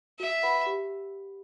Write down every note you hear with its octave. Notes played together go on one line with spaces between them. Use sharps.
F#4 E5
B4 F#5 B5
G4